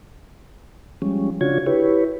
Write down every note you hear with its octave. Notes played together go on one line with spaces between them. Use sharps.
F3 G3 G#3 C#4
C#3 D4 F4 F#4 C#5 G#6
E4 G4 B4 C#5